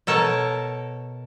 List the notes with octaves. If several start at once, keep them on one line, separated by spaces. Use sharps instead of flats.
B2 A4 A#4 C#5 A5